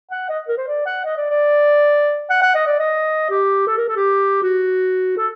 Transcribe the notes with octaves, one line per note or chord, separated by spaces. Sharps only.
F#5
D#5
A#4
C5
D5
F#5
D#5
D5
D5
F#5
F#5
D#5
D5
D#5
G4
A4
A#4
A4
G4
F#4
A4